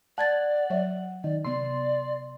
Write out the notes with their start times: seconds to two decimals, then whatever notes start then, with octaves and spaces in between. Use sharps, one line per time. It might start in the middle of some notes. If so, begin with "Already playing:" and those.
0.18 D5 F#5 A5 G#6 A6
0.70 F#3 C#5 E5
1.24 D#3 D5
1.45 C3 B3 D5 C6